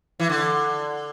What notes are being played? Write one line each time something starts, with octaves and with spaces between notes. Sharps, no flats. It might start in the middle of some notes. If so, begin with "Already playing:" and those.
E3
D3